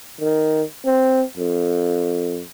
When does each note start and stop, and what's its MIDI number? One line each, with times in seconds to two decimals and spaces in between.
0.21 0.62 51
0.86 1.22 60
1.37 2.42 41